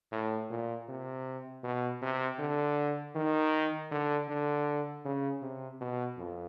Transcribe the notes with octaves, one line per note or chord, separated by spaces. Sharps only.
A2
A#2
C3
B2
C3
D3
D#3
D3
D3
C#3
C3
B2
F2